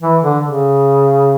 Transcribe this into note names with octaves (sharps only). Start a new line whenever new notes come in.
E3
D3
C#3